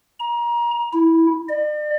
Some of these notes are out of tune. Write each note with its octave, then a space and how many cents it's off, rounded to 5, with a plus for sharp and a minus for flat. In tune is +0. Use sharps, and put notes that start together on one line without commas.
A#5 +25
E4 -10
D5 +40